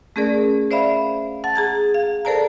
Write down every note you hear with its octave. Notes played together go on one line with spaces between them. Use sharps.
A3 C#4 G#4 A#4 D5
C5 D5 E5 F5 B5
F#5 A5 A6
G#4 A#5 G#6
F5
A4 A#4 C5 D5 A5 A#5